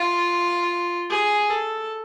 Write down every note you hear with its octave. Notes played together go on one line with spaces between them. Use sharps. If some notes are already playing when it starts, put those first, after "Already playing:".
Already playing: F4
G#4
A4